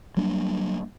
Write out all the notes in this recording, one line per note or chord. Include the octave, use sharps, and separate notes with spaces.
F#3 G3 A#3 D4